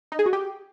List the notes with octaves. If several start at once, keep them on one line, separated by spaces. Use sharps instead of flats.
D#4
G#4
F#4
G4